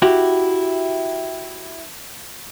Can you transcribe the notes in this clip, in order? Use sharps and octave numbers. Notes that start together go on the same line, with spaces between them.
E4 F#4 G4